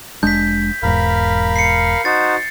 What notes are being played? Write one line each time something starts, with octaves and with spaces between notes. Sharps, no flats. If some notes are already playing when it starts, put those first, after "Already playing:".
F1 G#3 D4 G6 B6
E1 E2 G#2 A#4 F5 B5
C7 C#7
D#4 F#4 C5 A6